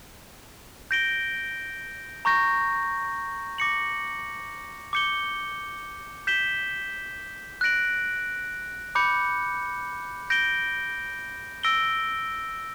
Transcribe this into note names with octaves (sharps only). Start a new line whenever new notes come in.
G6 A#6 D7 G7
A#5 C#6 G6 A#6
D6 A#6 C#7 F#7
D6 G6 C#7 G7
G6 B6 E7 G7
F#6 A#6 D7 F#7
B5 D6 G6 C#7
G6 A#6 D7 G7
E6 A#6 D7 G7